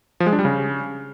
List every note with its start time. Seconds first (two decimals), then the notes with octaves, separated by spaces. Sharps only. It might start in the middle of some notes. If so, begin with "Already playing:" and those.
0.20 F3
0.26 G#3
0.33 D4
0.39 G3
0.45 C#3